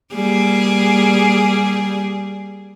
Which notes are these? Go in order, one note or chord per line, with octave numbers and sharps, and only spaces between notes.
G3 A#3 G#4